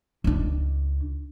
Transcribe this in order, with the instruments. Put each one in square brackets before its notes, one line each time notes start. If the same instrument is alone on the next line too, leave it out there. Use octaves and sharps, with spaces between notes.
[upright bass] C#2 D4